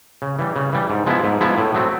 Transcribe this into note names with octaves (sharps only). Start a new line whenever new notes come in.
C#3
E3 G3
C#3
E3 G3
G#2
F3 G#3 B3 E4
G#2
F3 G#3 B3 E4
A2
F#3 A3 C4